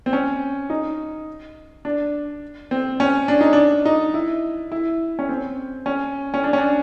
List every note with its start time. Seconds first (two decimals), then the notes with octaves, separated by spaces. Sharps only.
0.06 C4
0.13 C#4
0.70 D#4
1.85 D4
2.71 C4
3.00 C#4
3.28 D4
3.41 D#4
3.53 D4
3.85 D#4
4.14 E4
4.72 E4
5.19 C#4
5.29 C4
5.86 C#4
6.34 C#4
6.44 D4
6.53 C#4
6.58 D4